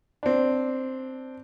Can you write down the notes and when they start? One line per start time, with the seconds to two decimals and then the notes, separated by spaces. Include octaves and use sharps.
0.23 C4 D4